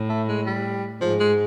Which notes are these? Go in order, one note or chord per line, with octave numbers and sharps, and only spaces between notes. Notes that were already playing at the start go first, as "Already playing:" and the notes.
Already playing: A2
A3
G#3
G3
G#2 F3
G#3